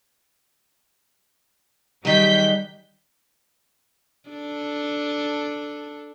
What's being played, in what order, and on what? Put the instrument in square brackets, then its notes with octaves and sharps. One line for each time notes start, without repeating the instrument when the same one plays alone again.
[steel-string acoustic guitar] G#2 D#3 F#3 [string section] G3 G6 B6
[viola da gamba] D4 A4